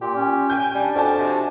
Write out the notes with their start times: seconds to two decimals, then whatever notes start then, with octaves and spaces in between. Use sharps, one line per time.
0.01 A#2 G4
0.16 C#4
0.50 G5 G#5 G6
0.75 G3 D4
0.95 F2 F#4 G#5 A5
1.18 C3